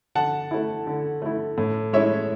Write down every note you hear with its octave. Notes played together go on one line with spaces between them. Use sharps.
D3 F#5 A5
A3 E4
D3
A3 E4
A2
G#3 C#4 E4 C#5 E5